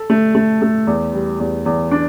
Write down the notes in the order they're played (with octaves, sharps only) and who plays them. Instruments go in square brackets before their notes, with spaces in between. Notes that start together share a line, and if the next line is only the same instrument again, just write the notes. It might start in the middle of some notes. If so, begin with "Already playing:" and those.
Already playing: [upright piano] A4
A3
A3
A3
E2
G3
E2
E2
D4